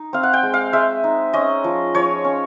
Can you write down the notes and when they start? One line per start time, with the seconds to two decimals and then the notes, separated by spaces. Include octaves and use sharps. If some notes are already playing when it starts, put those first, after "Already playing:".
Already playing: D#4
0.13 C4 F5
0.23 F#5
0.33 G5
0.43 G#3
0.54 F5
0.73 G#3 E5
1.04 D#4
1.33 C#4 D#5
1.64 F3
1.94 F3 C#5
2.24 C#4